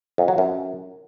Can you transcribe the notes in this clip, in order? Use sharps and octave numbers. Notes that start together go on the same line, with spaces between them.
F2
F#3
F#2